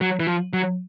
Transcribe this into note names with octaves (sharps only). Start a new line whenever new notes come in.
F#3
E3
F3
F#3